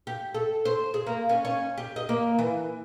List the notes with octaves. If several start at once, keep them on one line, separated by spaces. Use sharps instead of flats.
G4
A4
C5
G#4
A#3
C#4
C#4
G4
D#5
A#3
E3